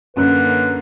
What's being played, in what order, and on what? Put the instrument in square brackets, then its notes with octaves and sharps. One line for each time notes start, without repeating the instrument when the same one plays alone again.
[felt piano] F#2 [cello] D3 A#3 [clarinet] B4